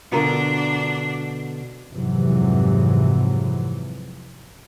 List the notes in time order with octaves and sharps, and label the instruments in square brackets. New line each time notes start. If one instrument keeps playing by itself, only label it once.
[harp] B2 D3 [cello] D4 [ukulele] F4 A#4
[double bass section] F2 G#2 C3 E3 F#3